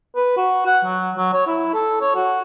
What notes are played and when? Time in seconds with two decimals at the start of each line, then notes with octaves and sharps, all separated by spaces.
0.16 B4
0.37 F#4
0.66 F#5
0.85 F#3
1.16 F#3
1.33 C#5
1.47 E4
1.74 A4
2.01 C#5
2.15 F#4